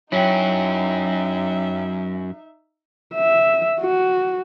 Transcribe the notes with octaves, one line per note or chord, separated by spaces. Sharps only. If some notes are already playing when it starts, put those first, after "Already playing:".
F#2 F#3 C#4 D#4 E4 C#5 E5 G5
E5
F#4